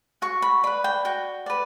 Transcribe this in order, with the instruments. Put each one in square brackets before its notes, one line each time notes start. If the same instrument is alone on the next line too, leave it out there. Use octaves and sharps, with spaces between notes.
[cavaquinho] F#4 C#6
B5
B4 D5 B5
G5
F#4 G5
B4 D5